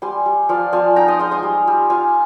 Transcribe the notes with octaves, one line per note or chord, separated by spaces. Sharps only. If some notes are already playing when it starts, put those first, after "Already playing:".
G3 G#5 C6
G3
F3 D5 F5
F3 F5 G#5
D#4 G5 A#5
C6 D#6
G#3 C6 D#6
G#5 C6
G3
G3
F4 F5 G#5